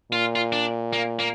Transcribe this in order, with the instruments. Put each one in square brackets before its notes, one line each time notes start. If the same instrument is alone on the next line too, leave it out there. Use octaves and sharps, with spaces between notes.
[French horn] A#2 [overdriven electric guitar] F4
[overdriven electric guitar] F4
D4
A#3
A#3